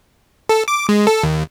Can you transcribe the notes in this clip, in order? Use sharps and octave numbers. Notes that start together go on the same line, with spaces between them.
A4
D6
G#3
A4
D#2